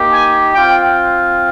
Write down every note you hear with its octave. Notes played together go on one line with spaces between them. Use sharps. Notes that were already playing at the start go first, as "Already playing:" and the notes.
Already playing: A#3 D#4 G4
G#5
C4 F4 G5